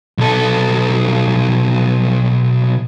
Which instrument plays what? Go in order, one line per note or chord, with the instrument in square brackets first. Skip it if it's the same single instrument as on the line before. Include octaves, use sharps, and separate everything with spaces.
[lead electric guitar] B1 A4